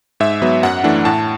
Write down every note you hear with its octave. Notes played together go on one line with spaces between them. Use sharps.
G#2 E5
F#3 B3
F#2 F#5
E3 A3 D4
A2 A5